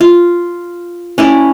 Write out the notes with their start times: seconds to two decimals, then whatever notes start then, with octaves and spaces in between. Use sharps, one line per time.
0.01 F4
1.18 C#4 E4 D5